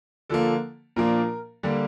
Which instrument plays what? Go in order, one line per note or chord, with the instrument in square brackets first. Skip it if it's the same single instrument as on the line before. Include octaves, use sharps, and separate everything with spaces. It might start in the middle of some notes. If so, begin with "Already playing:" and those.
[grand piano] D3 F3 A#3 A4
A#2 F3 A#3 D4 A#4
D3 G3 A#3